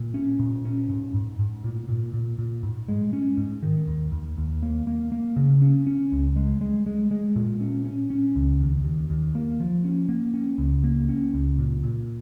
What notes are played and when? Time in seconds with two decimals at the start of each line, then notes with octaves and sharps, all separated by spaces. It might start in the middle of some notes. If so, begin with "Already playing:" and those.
Already playing: A#2
0.14 C#4
0.39 A#2
0.65 C#4
0.90 G#2
1.14 G#2
1.39 G#2
1.64 A#2
1.89 A#2
2.14 A#2
2.39 A#2
2.63 G#2
2.88 G#3
3.13 C#4
3.37 G#2
3.63 D#3
3.87 D#2
4.12 D#2
4.38 D#2
4.63 A#3
4.87 A#3
5.12 A#3
5.36 C#3
5.62 C#4
5.87 C#4
6.12 C#2
6.36 G#3
6.61 G#3
6.86 G#3
7.11 G#3
7.36 A#2
7.60 C#4
7.85 C#4
8.10 C#4
8.36 C#2
8.60 D#2
8.85 D#2
9.10 D#2
9.35 A#3
9.60 F3
9.84 C#4
10.09 A#3
10.34 C#4
10.58 C#2
10.84 A#3
11.09 C#4
11.33 C#2
11.59 A#2
11.84 A#2